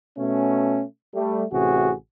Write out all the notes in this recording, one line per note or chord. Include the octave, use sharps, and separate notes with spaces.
B2 A3 C#4
G3 A3
A1 C3 F#4 G#4